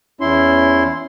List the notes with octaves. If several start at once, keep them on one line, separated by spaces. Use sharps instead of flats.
E2 C#4 E4 C6